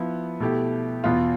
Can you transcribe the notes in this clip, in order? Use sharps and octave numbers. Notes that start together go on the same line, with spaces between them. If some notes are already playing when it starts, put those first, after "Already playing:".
Already playing: F3 B3 E4
B2 A3 E4 G4
E2 B2 B3 F4